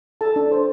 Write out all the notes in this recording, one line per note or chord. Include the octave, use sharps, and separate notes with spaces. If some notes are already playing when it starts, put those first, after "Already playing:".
A4 A5
D4
C5